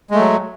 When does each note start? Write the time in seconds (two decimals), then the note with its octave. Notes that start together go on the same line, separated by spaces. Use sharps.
0.11 G#3
0.15 A3
0.19 F#3